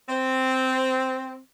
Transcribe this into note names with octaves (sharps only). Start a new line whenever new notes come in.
C4